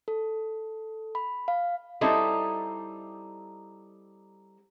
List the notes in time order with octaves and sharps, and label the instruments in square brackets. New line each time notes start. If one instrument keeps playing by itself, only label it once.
[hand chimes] A4
B5
F5
[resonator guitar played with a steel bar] G3 C4 D#4 E4 A4